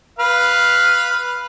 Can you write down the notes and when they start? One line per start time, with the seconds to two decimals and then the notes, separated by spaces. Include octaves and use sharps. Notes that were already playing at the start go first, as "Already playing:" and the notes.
0.19 B4 F5 F6